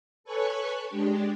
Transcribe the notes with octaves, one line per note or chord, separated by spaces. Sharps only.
A4 B4 C#5 G#5 C#6 F#6
G#3 D4 G4